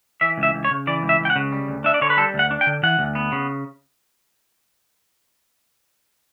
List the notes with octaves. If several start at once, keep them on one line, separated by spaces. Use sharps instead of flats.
E3 E5
C#2
E5
C#2
C#5
C#3
E3 D5
C#2
E5
C#2
G5
F#5
C#3
G3
D2
D4 E5
D5
D3 C#5
B4
G3 A4
D2
F#5
D4
G5
D3
E3 F#5
D2
B3
C#3